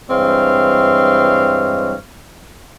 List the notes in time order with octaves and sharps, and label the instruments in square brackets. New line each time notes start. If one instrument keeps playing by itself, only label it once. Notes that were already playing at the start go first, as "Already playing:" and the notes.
[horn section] G2 E3 G#3 C4 C#5 F5